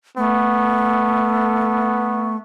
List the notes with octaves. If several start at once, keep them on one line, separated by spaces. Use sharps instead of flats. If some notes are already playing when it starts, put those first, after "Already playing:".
A3 B3